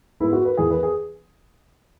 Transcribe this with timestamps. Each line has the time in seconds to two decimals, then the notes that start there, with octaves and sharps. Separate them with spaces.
0.20 G#2 G#3 B3 E4
0.33 F#4
0.45 B4
0.57 E2 E3 B3 G#4
0.70 B4
0.83 G#4